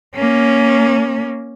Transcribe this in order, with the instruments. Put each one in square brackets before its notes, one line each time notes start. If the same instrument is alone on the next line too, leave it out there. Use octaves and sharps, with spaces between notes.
[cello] A#3 C#4